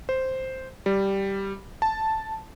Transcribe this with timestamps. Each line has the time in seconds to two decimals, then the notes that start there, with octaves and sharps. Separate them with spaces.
0.09 C5
0.86 G3
1.82 A5